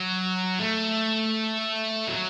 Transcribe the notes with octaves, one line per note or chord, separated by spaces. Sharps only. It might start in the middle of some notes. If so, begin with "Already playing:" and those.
Already playing: F#3
A3
F#3